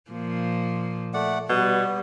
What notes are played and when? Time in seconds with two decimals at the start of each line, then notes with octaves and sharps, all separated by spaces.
0.11 A#2 F3 A#3
1.14 A3 D5 F#5
1.49 B2 G3 B3